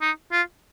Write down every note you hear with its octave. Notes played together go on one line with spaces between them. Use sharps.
D#4
F4